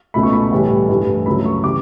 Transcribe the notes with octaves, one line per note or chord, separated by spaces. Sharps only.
C#2 B2 A3 B5
C#6
B5
A5
A2 E3 G3
G2 E3 A3
C#2 C#3 F#3 A3 B5
C#6
C#3 E3 G3 D6